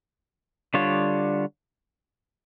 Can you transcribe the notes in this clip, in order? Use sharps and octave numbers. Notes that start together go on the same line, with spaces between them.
D3 G3 D4 F4 C#5